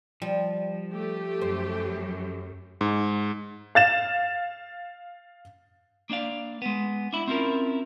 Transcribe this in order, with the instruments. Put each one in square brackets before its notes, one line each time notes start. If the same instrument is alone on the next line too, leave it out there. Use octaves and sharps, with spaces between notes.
[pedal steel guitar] F3 [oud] G3
[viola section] A3 G4
[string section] F#2 [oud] C5
[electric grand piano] G#2
[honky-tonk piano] F5 A6 E7
[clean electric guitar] A#3 D4 D5 F5
G#3 B3
D4 E4
C4 C#4 E4 F4 A#4